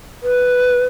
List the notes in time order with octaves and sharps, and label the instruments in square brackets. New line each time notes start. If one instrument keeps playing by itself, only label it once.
[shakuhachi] B4